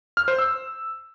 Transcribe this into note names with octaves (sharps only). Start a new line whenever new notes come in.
F6
C5
E6